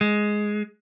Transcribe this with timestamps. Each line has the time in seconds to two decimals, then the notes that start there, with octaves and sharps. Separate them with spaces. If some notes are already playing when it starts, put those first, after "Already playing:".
0.01 G#3